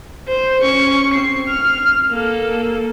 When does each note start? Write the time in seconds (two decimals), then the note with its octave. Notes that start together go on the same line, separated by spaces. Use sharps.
0.28 C5
0.61 C#4 C#6
1.14 C4 C7
1.48 F6
2.11 A#3 A4